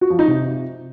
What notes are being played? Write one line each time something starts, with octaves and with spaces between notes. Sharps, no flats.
F#4
F3
D#4
C3